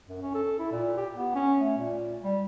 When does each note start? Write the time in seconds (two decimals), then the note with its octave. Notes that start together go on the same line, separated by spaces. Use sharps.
0.08 F#2
0.22 C#4
0.35 A4
0.59 E4
0.72 A#2
0.97 G4
1.16 B3
1.35 C#4
1.60 A3
1.78 A#2
2.23 G3